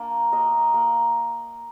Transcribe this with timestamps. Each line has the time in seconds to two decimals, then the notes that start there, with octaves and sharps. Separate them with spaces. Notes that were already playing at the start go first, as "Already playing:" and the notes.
Already playing: A#3 D4
0.32 A#3 D#5
0.74 A#3